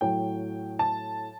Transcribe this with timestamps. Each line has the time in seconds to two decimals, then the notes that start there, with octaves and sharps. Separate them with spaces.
0.01 A2 F#3 G5
0.79 A5